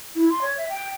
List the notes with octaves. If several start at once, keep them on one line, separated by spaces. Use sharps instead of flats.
E4
C6
C#5
E5
G5